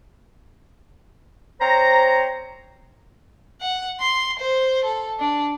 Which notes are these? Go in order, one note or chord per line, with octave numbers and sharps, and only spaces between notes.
C4 C5 C#5 A#5
F#5
C6
C5
A4
D4